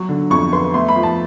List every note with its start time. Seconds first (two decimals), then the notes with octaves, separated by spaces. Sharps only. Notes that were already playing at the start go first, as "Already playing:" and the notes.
Already playing: F#3 C#6
0.09 D3
0.30 F2 C#6
0.53 B3 C6
0.74 A3 C6
0.89 B5
0.96 F3
1.03 A5